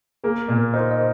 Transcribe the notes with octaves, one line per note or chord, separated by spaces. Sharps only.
A#3 G#4
A#2
A#4
D#4 C5
D#5